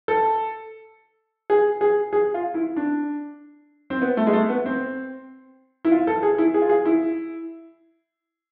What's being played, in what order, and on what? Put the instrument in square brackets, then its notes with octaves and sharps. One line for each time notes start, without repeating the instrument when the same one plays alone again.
[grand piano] A4
G#4
G#4
G#4
F4
E4
D4
C4
B3
A3
G#3
A3
B3
C4
E4
F4
A4
G#4
E4
G#4
F4
G#4
E4